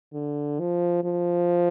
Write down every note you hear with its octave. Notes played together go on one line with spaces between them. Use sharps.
D3
F3
F3